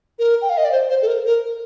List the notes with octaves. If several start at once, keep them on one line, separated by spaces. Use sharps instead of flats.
A#4
G5
F5
D#5
D5
C5
C5
A4
A#4
A#4